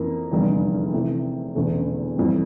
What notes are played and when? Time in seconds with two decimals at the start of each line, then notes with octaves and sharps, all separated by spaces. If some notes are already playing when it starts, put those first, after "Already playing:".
Already playing: F2 E3 A#3
0.32 F1 E2 D3 G3
0.93 C3 E3 A3
1.55 E1 E2 D3 A3
2.17 F2 E3 G3